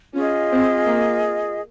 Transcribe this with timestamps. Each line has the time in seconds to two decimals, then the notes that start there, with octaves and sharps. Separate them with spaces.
0.15 C#4 F4 G#4 D#5
0.51 C4
0.87 A#3